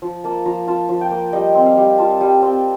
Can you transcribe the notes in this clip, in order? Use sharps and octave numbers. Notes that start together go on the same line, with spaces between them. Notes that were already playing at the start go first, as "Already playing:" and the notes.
F3
A#3 A5
F3 A#5
F4 A5
F3
G5
A#3
G3 D#5
C4
F5
G3
F4 A5
G3
C4